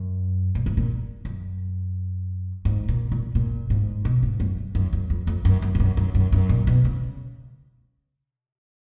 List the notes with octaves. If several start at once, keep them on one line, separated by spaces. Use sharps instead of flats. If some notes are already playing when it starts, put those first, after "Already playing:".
Already playing: F#2
A#2
G#2
A#2
F#2
G#2
A#2
A#2
A#2
G#2
B2
G#2
F#2
F#2
F#2
F2
F2
F#2
F#2
G#2
F#2
F#2
F#2
F#2
A#2
B2
C#3